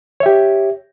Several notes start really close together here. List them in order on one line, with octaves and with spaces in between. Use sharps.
C#5 E5 G4